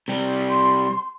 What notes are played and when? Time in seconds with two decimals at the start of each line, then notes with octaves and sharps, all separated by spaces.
0.08 C3 G3
0.50 C6